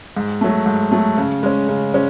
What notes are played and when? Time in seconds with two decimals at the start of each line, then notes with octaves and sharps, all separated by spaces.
0.17 G#2
0.41 F#3 A3
0.66 G#2
0.92 F#3 A3
1.17 C#3
1.43 G#3 C#4
1.69 C#3
1.94 G#3 C#4